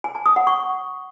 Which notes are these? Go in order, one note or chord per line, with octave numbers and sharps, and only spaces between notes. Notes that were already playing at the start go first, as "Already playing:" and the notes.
G#5
A5
D#6
F#5
C#6